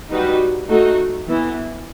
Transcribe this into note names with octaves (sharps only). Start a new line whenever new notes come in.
G3 D#4 F#4 B4
A3 D#4 F#4 A4
E3 B3 E4